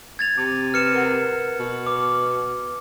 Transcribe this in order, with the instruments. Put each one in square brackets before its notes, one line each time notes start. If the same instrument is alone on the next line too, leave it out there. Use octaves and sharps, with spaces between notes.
[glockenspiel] G#6 A6 F7
[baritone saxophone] C3 [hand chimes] D6
[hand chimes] G4 B4 [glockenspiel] F6 C#7 E7
[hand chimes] A#4 B4 F#5
[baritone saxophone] B2
[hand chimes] B4 [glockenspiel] D6